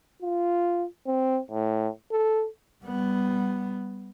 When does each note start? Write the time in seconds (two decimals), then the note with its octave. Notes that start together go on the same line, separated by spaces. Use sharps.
0.22 F4
1.07 C4
1.51 A2
2.12 A4
2.84 G3 B3